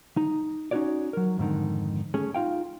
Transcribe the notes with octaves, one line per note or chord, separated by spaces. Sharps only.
D#4
C#4 D#4 E4 F#4 C#5 D5
F#3 A#4
F2 G#2 D3 D#3
A3 C#4 G#4
D#4 F4 F5 G5